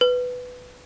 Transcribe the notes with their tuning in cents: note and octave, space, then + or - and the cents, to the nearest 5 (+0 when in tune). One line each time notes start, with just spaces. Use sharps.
B4 +5